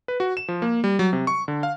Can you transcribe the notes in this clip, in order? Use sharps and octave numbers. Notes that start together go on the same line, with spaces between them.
B4
F#4
E7
F3
A#3
G3
F#3
C3
C#6
D3
F5